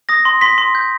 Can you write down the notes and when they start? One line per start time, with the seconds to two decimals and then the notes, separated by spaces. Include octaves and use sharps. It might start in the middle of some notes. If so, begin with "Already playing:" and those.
0.09 D#6 A#6
0.25 C6
0.41 C6 B6
0.58 C6
0.75 G6